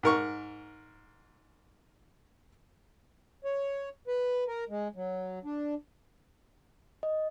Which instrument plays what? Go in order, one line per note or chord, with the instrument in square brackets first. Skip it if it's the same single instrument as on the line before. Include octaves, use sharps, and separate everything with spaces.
[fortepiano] G#2 A#4 C#6
[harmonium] C#5
B4
A#4
G#3
F#3
D4
[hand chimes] D#5